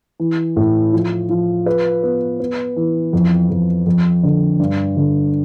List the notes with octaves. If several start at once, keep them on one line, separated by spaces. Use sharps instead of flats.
E3
A2
F3
F3
B4
B3
B3
E3
F2
F2
F2
D3
G2
D3